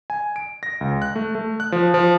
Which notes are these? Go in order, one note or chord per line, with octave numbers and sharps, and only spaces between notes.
G#5
D7
A#6
C#2
F#6
A3
A3
F#6
F3
F3